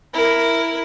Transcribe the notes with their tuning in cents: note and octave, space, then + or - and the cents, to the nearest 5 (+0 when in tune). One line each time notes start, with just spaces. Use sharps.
E4 +0 A#4 +0